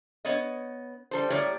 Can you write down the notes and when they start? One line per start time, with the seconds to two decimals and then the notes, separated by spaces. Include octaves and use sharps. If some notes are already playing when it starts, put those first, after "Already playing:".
0.25 B3 C#5 D#5
1.11 G3 A4 C5
1.30 A2 G3 A#3 C#5 D5